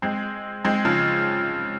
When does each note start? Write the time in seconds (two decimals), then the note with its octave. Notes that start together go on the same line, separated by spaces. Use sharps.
0.02 G#3 C4
0.65 G#3 C4
0.85 C#3 F3